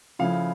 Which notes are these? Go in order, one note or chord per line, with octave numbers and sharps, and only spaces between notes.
C#3 F3 A3 E4 F5